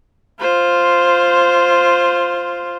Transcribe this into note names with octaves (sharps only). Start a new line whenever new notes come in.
F4 C5